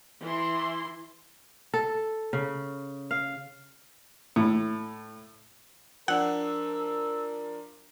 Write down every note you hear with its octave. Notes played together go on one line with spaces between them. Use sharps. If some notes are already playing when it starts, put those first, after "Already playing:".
E3 E4 C6
A4
C#3
F5
A2
F3 D4 A#4 F#5 E6